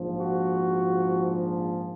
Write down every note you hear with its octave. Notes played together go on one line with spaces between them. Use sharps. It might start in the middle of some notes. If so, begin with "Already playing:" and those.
Already playing: A#1 G#2 F3
F#4